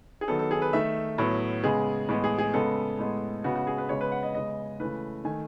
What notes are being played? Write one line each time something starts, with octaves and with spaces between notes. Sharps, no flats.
G#4
D#3 F#3 B3 A4
A4
G#4
B4
D#3 A3 E5
A2 F#3 B3
C#3 G#3 B3 G#4
A2 E3 G#3 B3
G#4
G#4
C#3 G#3 B3 A4
A2 G#3 B3
C#3 G#3 B3 F#4
F#4
G#4
B4
C#3 G#3 B3 C#5
B4
F#5
D#5
C#3 G#3 B3 D#5
C#3 E3 A3 B4
D#3 A3 G#5